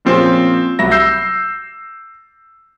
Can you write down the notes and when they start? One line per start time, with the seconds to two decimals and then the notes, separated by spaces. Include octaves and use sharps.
0.05 A#2 F3 C4 C#4 G#4
0.79 C2 F#3 E5 A#6
0.91 D6 E6 G6 C7